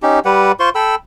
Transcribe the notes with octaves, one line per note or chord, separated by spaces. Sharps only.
C#4 D#4 G4
G3 G4 B4 F#5
F4 C5 C6 C#6
A4 G5 B5 E6